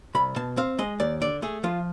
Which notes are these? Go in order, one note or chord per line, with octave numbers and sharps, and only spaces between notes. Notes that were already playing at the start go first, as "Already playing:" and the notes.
C2 B5
B2 A5
C4 F5
G#3 D#5
D#2 D5
D3 D5
A3 G#4
F3 F4